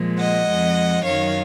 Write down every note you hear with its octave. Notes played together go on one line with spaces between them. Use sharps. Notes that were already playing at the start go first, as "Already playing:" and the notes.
Already playing: A#2 F3 G#3
D#5 F#5
F2 F3 G#3
F#2 D#3 F#3 C#5 F5